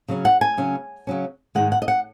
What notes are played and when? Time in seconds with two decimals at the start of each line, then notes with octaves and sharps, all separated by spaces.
0.08 C#3 F#3 C#4
0.25 F#5
0.41 G#5
0.57 C#3 F#3 C#4
1.07 C#3 F#3 C#4
1.55 G#2 D#3 G#3 F#5
1.72 F#5
1.82 D#5
1.88 F#5